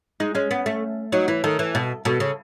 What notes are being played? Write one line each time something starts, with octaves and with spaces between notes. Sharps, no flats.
G#3 D#4
G#3 C#4
B3
A3
F#3 D#4
E3 E4
D#3 A4
E3
B2
B2 A4
C#3